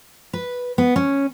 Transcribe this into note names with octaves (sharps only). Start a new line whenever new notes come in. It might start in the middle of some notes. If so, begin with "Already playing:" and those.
B4
B3
C#4